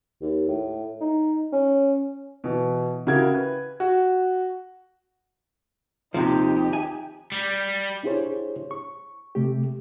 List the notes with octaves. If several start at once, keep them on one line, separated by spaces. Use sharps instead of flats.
D#2
A2
D#4
C#4
B2 E3
C#3 E4 F#4 G4 A#4 G#6
B4
F#4
D#2 C3 F3 D#4 G4
G#5
G3
D4 E4 G4 G#4 C5 C#5
C#6
C3 A3 G4